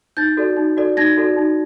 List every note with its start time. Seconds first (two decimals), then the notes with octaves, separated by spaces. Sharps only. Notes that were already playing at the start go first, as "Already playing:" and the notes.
0.17 D#4 G6 A6
0.37 F#4 A4 D5
0.57 D#4
0.77 F#4 A4 D5
0.97 D#4 G#6 A#6
1.17 F#4 A4 D5
1.37 D#4